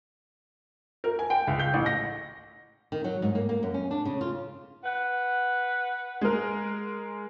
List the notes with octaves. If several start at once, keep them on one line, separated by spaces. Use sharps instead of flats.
A#4
G#5
G5
C#2
G6
A1
A#6
D#3
F#3
G#2
A#3
A#3
F#2
C#4
D4
C#3
F4
B4 F#5
G#3 A#4